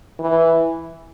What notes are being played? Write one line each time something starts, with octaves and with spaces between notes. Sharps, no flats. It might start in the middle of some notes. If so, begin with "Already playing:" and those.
E3